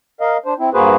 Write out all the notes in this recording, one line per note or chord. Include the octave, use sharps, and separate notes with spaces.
A#4 D#5 F5
D4 C5
C4 E4
G2 A#3 F#4 G#4 B4 C5